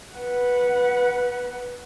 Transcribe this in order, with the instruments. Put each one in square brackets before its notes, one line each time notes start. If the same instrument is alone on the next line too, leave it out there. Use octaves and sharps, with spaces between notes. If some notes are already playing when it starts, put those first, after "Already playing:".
[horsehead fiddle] B4 F#5